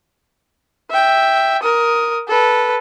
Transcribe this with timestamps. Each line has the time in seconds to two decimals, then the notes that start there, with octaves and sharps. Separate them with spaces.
0.90 E5 G5
1.63 A#4 D#6
2.28 A4 B4